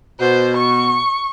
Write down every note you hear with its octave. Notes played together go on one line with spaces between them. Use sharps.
B2 C5
C#6